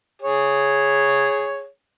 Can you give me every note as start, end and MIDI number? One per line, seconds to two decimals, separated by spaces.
0.22 1.66 68
0.22 1.66 73